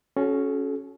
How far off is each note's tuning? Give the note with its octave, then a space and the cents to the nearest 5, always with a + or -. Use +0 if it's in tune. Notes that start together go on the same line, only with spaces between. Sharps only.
C#4 +0 F#4 +0 A4 -40